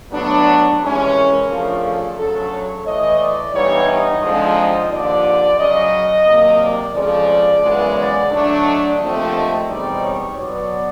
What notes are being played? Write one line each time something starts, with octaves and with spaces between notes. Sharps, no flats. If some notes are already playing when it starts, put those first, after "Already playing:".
A2 F#3 B3 D4
C3 E3 G#3 C#4
A#4
C#3 F3 A3 D4
A4
D2 C#3 F#3 A4
C#5
A2 E3 A3 D#5
D5
G2 E3 G3 B3 D#4 C#5
D#5
D3 F3 G#3 C4 D#4
D#2 D3 F3 D5
F#2 C#3 F#3 D#5
C3 D#3 F#3 A#3
D5
F2 C#3 F3 G#3 D5
F#2 C#3 E3 G#3 B3
D5
D3 F#3 A3 D4
D#5
D#2 D3 F3 A3 C4
E2 B2 G3 C4 D#4 D5
C#5
B2 F#3 B3 D5